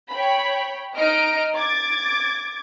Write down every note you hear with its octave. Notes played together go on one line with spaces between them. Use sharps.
C#5 G5 B5
D#4 D#5 F6 D7
D6 G#6 A6